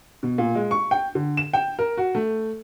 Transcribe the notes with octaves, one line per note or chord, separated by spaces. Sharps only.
B2
A#2
G#3
C#6
G5
D3
E7
G5
A#4
F#4
A3